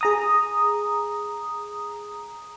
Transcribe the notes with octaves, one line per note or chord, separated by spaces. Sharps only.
G#4 A#5 D#6